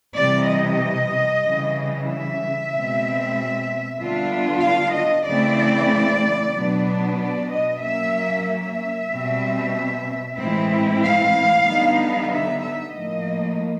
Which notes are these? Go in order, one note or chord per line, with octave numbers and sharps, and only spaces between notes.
C3 E3 G3 D5
D#5
C#3 E3 G3
E5
B2 G#3 C4
D3 G3 B3 D4 F4
F5
D#5
C#3 E3 A3 C4 E4 D5
B2 F#3 B3 D4
D5
D#5
F#3 A#3 C#4 E5
E5
B2 G3 C4
A2 E3 G#3 C4 E4
F5
D3 G3 B3 D#4
E5
E5
A2 F3 A#3 D#5